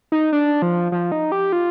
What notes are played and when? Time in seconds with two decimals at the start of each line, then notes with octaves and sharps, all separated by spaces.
0.12 D#4
0.33 D4
0.62 F3
0.92 F3
1.12 D#4
1.32 G4
1.53 F4